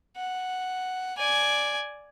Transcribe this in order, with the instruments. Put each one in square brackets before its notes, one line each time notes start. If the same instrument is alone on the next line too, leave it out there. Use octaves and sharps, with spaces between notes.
[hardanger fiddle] F#5
D5 G#5